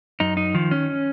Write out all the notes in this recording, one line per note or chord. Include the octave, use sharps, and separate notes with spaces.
F#2 D#4
D#4
D#3 F3
C#4